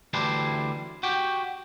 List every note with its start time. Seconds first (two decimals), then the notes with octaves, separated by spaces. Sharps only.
0.13 D2 E3 G3 D4 E4 C5
1.03 F#4 G4 G5